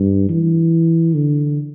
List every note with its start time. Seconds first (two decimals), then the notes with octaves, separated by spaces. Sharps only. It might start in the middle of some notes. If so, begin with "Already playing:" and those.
Already playing: G2
0.29 E3
1.14 D3